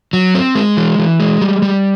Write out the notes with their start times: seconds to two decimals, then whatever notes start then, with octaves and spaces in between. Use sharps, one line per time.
0.13 F#3
0.34 C4
0.55 G#3
0.77 E3
0.99 E3
1.20 G#3
1.41 G3
1.62 G3